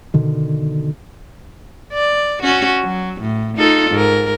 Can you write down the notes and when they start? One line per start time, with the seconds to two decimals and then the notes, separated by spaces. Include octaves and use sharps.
0.14 B2 D3 D#3
1.93 D5
2.43 C#4 F#4
2.83 F#3
3.21 A2
3.57 D#4 F4 A4
3.91 G#2 A#4